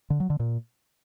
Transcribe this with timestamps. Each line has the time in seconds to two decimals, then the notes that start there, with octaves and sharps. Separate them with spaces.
0.10 D3
0.20 F#3
0.30 D3
0.40 A#2